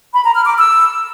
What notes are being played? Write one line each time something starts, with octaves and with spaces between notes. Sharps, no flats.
B5
A#5
F6
D6
E6